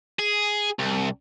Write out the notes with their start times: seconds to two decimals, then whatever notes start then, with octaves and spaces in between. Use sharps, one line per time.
0.19 G#4
0.79 C2